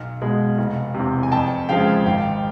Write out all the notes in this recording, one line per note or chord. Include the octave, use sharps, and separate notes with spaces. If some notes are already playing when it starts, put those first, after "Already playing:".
Already playing: B1 F5
B2 G#3
F1
E2 C3
G#5
F2 G5 A5
C#3 F3 G#3 F5 G5
G#1 F5 G5